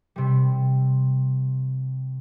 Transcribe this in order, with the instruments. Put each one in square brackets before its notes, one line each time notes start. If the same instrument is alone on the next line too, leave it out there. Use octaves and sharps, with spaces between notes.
[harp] C3 G3